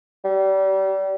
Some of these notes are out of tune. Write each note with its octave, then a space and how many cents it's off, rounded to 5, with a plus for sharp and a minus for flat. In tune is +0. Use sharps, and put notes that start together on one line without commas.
G3 -30